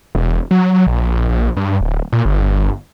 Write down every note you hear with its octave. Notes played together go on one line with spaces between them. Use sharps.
E1
F#3
A#1
A#1
G2
D1
A#2
G1